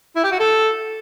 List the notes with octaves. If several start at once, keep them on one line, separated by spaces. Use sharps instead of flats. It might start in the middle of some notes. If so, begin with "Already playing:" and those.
E4
G4
F#4
A4